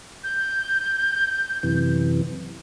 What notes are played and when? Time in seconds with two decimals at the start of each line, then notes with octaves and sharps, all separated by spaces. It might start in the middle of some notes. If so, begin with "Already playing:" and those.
0.24 G6
1.63 F#2 C3 E3